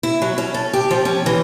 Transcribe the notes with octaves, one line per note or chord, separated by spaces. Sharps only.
E4
F#3
C#4
A4
G4
F3
C#4
E3